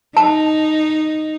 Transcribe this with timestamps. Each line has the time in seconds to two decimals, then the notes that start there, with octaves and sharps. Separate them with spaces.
0.17 D#4 A5